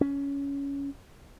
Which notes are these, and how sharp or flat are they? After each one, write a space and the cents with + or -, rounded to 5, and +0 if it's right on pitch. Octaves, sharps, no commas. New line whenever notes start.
C#4 +15